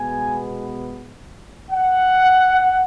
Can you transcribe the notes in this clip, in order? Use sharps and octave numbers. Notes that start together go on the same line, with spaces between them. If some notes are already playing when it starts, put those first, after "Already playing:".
Already playing: B2 G#3 B3 G#5
F#5